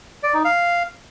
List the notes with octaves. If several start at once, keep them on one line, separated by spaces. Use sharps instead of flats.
D5
D#4
F5